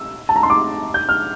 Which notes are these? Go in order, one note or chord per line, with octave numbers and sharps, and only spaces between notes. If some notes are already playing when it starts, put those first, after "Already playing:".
Already playing: E6
A5
A#5
C6
D6
G6
F6